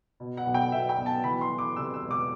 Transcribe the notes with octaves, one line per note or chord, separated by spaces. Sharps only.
B2
F#5
B1
G5
B2 E5
G5
B1
A5
E3 B5
C6
E3
D6
C3 E6
E6
E1
D6